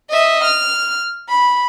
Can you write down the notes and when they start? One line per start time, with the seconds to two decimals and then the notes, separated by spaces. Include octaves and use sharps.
0.10 D#5 E5
0.44 F6
1.29 B5